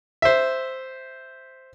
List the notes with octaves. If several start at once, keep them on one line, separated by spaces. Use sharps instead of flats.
C5 E5